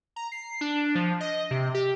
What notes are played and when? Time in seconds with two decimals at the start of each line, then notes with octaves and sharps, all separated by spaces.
0.16 A#5
0.32 C7
0.61 D4
0.95 F3
1.20 D#5
1.51 C3
1.74 G4